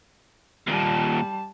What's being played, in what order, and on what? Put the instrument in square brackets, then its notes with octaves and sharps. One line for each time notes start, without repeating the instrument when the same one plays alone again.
[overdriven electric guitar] D#2 A#2 [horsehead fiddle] G3 A5